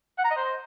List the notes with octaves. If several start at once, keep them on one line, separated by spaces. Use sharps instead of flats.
F#5
A#5
D#5
C5